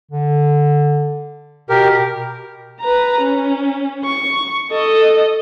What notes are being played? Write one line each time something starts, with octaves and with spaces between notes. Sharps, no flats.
D3
B2 G4 A#4
B4 A#5
C#4
C#6
A4 D#5